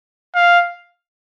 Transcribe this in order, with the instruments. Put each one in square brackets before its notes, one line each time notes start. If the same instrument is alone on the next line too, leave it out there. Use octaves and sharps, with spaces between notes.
[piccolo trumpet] F5